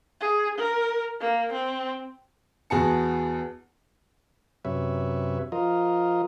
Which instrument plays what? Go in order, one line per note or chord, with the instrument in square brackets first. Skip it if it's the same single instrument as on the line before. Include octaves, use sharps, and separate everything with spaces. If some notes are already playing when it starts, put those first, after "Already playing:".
[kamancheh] G#4
A#4
A#3
C4
[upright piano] E2 B3 F#4 G#4 A5 C#7
[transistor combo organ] F#2 C3 B4 C#5 E5
F3 F4 A#4 D#5